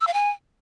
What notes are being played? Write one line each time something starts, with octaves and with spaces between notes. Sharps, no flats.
E6
F5
G#5